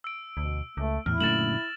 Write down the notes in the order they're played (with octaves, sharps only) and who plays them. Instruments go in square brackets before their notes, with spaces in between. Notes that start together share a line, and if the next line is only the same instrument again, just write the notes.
[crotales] E6 D7
[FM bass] D2 [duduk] B2
[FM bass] C#2 [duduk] A3
[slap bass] E2 [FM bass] A2 [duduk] E4 [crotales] F6
[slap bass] F#2 A#2 D3 [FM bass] A3 [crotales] A6 E7 F#7